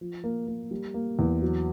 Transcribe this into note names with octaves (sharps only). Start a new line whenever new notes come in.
F3
A#3
A#3
G3
A#3
E2
F#3